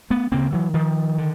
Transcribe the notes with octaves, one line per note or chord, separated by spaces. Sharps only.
A3 B3
D2 C#3 A#3 C4
E3 F#3
D#3 F3
D3